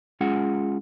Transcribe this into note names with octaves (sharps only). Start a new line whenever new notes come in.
G#3 C#4 F4 G#4 F#5